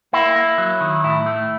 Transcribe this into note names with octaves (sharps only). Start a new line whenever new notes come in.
A#3 E4
A#3
F#3
D#3
A2 E4
A3